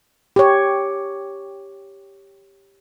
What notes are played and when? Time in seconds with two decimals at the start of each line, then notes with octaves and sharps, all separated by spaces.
0.36 G4 C#5